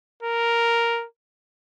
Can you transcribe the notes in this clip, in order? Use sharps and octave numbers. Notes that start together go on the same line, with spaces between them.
A#4